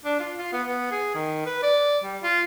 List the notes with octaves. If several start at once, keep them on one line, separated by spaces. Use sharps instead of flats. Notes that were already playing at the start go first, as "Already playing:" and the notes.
D4
F4
F4
B3
B3
G#4
D#3
B4
D5
G3
F4